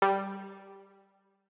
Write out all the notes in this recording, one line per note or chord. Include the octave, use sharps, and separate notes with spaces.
G3